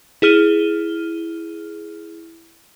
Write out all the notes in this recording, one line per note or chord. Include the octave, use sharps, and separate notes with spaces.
E4 G#4 F6 D#7 G7